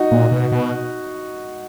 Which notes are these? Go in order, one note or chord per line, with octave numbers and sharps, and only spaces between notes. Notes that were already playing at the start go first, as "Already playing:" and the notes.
Already playing: D#4 F#4
A#2
B2
B2